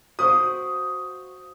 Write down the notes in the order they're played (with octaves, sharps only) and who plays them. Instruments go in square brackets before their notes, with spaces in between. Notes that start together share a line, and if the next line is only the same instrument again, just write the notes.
[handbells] F#4 C5 F5 [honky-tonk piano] D#6